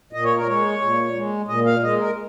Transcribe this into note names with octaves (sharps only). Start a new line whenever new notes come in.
A#2 D#5
C#5
A#4
G#3 C#5
A#2
G#3
A#2 D#5
F5
G#3 D#5
A#4